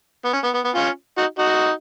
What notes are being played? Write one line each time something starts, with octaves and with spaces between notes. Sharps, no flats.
B3
C#4
B3
B3
B3
C#4 F4
D#4 F#4
D#4 F#4